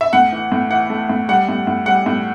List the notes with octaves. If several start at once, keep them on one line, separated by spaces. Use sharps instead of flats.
E5
A2 F#5
E3
A2
E3 F#5
A3
A2
G3 F#5
A2
A2
G3 F#5
A2